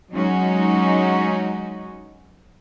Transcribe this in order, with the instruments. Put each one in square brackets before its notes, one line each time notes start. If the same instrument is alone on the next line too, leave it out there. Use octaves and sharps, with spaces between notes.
[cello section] F#3 G#3 C#4 D#4 F#4